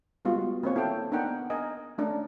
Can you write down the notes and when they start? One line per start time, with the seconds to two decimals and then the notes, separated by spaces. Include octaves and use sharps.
0.25 G3 G#3 B3 F4 F#4
0.63 A#3 C4 C#5
0.76 E4 A4 C5 G5
1.12 B3 D4 D#4 A#4 F#5 G5
1.50 A#4 D#5 G#5
1.98 A3 C#4 D4 A#4